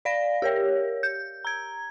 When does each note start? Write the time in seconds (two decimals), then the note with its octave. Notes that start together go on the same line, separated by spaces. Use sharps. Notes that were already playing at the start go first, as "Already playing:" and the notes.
0.05 D5 F5 A#6
0.42 G4 A#4 C#5
1.03 G6
1.45 A#5 G#6